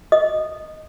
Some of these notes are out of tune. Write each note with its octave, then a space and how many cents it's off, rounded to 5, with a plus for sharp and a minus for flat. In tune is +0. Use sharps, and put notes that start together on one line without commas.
D#5 +0 D#6 -15